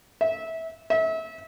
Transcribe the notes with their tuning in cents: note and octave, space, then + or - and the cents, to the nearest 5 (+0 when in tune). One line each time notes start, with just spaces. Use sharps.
E5 -20
E5 -30